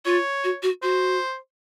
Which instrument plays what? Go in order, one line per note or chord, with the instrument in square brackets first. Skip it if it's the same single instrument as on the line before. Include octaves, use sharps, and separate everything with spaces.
[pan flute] F4 [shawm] C#5
[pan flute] F#4
F#4
[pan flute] F#4 [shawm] C5